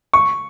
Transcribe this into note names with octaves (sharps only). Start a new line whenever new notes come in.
C#6